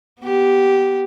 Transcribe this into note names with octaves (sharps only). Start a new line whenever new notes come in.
B3 G4